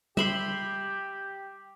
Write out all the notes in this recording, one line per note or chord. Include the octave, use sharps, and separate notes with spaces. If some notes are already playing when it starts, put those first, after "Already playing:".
G3 G4 E5 B5 C6